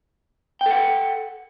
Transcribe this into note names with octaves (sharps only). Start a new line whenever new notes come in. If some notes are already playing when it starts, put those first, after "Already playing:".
A4 F#5 G5